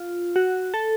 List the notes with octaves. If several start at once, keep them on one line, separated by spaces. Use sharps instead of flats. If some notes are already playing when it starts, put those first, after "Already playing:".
Already playing: F4
F#4
A4